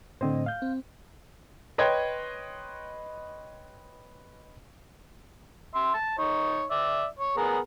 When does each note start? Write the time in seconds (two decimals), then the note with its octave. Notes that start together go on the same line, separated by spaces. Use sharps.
0.21 A2 D3 C4 C5 D#5
0.46 F5 G6
0.62 C4
1.78 B4 C#5 D#5 G5 C6 G#6
5.75 E5 C6
5.94 A5
6.18 D#4 C#5
6.71 D5 E5
7.19 C#5
7.37 B3 G#4 A#4